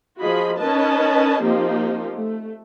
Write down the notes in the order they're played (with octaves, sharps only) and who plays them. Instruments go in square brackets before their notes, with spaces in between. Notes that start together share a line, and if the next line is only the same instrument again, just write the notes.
[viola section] F3 F4 F#4 G#4 D#5 B5
C#4 D#4 A#4 B4 D#5 A5
F3 A#3 C4 D#4 F4 G4
A3